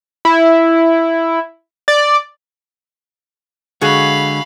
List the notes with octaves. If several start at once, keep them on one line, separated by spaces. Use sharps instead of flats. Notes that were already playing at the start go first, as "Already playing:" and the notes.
E4
D5
D3 G#3 F#4 G#4 F5 B5